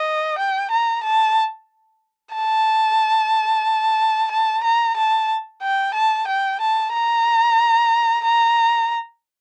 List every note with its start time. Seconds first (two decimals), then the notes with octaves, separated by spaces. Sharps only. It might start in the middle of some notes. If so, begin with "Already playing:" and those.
Already playing: D#5
0.39 G5
0.71 A#5
1.04 A5
2.35 A5
4.32 A5
4.64 A#5
4.97 A5
5.63 G5
5.95 A5
6.28 G5
6.61 A5
6.93 A#5
8.25 A#5